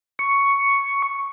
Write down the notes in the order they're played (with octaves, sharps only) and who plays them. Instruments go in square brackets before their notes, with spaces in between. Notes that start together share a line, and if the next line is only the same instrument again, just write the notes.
[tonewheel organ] C#6